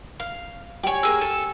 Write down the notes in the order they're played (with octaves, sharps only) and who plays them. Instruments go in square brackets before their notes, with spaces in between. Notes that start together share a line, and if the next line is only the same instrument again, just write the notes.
[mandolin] F5
[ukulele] G4 G#5 [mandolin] C#5 D5
[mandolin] A#3 G#4 E6
A4